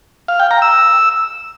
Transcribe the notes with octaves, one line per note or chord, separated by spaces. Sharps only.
F5
G5
A#5
E6